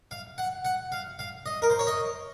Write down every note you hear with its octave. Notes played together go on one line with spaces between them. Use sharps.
F5
F#5
F#5
F5
F5
D#5
A#4
C5
C#5
D#5